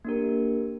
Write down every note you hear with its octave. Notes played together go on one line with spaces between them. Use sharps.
A#3 D4 G4 A#4